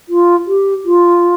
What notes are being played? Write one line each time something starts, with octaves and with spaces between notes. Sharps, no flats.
F4
G4
F4